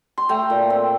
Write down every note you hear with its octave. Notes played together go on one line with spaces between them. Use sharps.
C6
A3 G5 A#5
A#2
C4